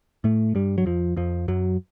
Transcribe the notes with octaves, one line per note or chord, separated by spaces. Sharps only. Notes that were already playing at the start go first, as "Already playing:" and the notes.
A2 A3
G2 G3
F#3
F2 F3
F2 F3
F#2 F#3